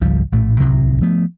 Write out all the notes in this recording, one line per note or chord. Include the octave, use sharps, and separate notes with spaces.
G#1 C#2 F3 G3
A#1 A2 A3
D1 C2 C3 F#3
F3 A3 B3